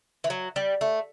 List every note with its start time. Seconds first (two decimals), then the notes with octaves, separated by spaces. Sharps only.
0.24 E3
0.30 F#3
0.56 G3
0.81 A3